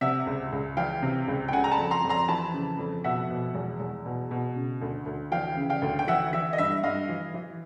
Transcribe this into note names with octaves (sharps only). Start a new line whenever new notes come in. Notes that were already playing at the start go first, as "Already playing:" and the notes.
C3 E5 F#5
C#2
C#2
E3 F5 G5
C3
C#2
G5
C#3 F#5 G#5
A#5
A5 B5
F2
A#5 C6
F2
A#5 C6
E3 A5 B5
C#3
F2
B2 E5 F#5
B2
E2
E2
B2
B2
C#3
D2
D2
E3 F5 G5
C#3
F5 G5
D2
G5
E3 E5 F#5
E3 E5
D#5
G2 E5
G2 D#5 F5
E3
E3